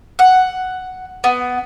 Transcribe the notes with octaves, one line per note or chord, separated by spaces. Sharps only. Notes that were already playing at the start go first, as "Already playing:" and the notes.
F#5
B3